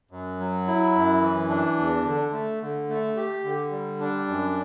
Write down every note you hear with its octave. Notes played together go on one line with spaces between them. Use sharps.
F#2
F#3
E4
F#2
E3
D4
E2
D3
A3
D3
A3
G4
D3
G3
D4
F#2